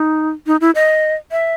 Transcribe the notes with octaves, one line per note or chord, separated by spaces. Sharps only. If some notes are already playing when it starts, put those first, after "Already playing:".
Already playing: D#4
D#4
E4
D#5
E5